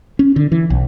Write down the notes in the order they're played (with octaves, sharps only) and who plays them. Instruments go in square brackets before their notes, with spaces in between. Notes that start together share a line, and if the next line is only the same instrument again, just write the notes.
[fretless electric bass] C#4
D3
E3
B1